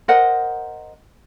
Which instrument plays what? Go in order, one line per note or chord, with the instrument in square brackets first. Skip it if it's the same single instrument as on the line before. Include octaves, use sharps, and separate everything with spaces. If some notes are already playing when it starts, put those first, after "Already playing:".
[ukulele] A#4 C5 D#5 F#5